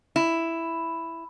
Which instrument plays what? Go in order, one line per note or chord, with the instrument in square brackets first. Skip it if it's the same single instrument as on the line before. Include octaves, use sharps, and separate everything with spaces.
[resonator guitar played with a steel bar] E4